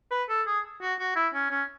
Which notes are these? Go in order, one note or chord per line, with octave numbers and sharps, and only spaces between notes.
B4
A4
G#4
F#4
F#4
E4
C#4
C#4